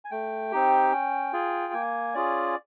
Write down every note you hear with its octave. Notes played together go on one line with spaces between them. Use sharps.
G#5
A3 G5
C4 D#4 G4
C#4
F4 G#4
A#3 G#5
C#4 F4 G#4 D5